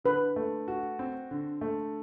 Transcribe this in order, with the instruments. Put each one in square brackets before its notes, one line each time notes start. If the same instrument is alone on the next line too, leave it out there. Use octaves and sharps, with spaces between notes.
[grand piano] D3 [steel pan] B4
[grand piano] A3
F#4
C4
D3
A3